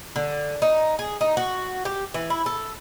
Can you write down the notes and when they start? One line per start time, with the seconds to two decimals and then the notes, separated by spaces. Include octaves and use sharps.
0.16 D3
0.62 D#4
0.99 G#4
1.21 D#4
1.37 F#4
1.85 G4
2.14 E3
2.30 E4
2.46 A4